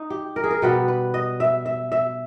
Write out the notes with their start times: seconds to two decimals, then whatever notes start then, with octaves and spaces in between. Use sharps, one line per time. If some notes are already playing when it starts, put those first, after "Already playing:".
Already playing: D#4
0.10 G4
0.36 A#4
0.44 G#4
0.51 A#4
0.62 B2 G3 B3 B4
0.88 B4
1.14 D#5
1.40 E5
1.66 E5
1.92 E5